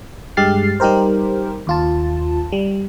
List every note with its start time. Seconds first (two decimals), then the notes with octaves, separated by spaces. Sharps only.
0.37 G2 G#3 G4 F6 A6 C7
0.80 G3 D#4 G4 A#4 C5
1.67 D#2 F4 A5
2.52 G3